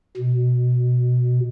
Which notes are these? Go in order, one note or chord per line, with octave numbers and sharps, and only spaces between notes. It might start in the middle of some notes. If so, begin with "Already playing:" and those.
B2